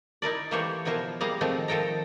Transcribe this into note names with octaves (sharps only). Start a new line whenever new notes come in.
D#4 E4 A#4 D5
E3 A3 A#3 G4 C5 C#5
B2 F3 E4 A#4 C5
G3 A#3 G#4 F5 A#5
D#3 F3 G#3 A3 C4
D#3 F3 A4 G5 A#5